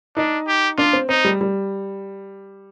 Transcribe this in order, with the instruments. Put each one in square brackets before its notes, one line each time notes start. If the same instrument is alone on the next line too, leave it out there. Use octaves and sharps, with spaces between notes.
[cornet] D4 [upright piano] D#4
[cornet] G4
[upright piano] D4 [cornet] F4
[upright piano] C4
[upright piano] C4 [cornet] D#4
[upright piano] G3
G3